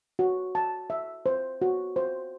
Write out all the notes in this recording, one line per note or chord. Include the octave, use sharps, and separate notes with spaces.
F#4
A5
E5
C5
F#4
C5